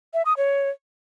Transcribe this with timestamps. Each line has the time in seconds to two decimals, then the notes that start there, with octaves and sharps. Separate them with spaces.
0.14 E5
0.25 D#6
0.37 C#5